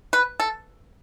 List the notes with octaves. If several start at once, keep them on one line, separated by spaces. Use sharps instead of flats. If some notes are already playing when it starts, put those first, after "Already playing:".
B4
A4